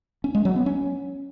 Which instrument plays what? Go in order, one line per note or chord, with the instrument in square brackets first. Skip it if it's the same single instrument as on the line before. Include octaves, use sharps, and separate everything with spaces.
[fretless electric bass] C#4
G#3
F#3
B3
C#4